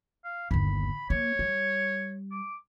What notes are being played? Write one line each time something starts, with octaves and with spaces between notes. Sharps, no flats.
F5
G1 D#2 B5
A#3 C#5
G3
D6